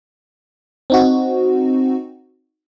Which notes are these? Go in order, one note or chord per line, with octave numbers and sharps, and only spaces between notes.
C4 D#4 F#4